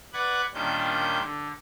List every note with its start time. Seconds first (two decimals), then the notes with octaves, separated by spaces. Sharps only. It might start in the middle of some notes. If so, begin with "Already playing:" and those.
0.13 B4 D5 F#5 F#6 G#6
0.54 A#2 D#3 G3 C#4 D4 G6
1.22 D3